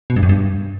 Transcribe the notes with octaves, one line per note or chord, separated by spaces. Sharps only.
B2
G2
F#2
G2